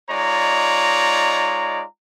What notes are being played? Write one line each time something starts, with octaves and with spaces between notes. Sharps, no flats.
G#3 D#4 F4 C#5 D5 A#5